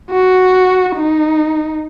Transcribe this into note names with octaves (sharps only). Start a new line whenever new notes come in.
F#4
D#4